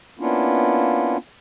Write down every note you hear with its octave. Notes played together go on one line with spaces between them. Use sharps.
A#3 B3 C#4 D4 E4 F4